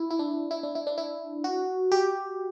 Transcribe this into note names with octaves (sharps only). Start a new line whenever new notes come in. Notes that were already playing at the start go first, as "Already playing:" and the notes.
Already playing: E4
E4
D4
E4
D4
E4
D4
E4
F#4
G4